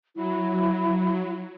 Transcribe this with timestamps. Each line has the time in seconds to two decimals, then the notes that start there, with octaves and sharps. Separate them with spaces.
0.15 F#3 E4